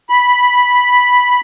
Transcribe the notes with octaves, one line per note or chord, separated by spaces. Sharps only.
B5